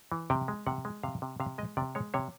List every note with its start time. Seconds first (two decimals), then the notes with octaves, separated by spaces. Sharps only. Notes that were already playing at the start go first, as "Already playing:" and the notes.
0.12 E3
0.30 C3 G5
0.48 G#3
0.66 C3 F#5
0.85 G#3
1.03 C3 F5
1.22 C3
1.40 C3 F5
1.58 G#3 D#5
1.77 C3 D5
1.95 G#3 C#5
2.14 C3 C#5